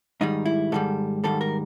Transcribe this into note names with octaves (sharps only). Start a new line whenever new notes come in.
G#2 D#3 G3 D#4
E4
G#2 D#3 G3 A4
G#2 D#3 G3 A4
A#4